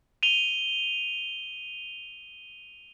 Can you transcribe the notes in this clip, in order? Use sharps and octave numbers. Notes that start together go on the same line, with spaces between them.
D#7 F7 G7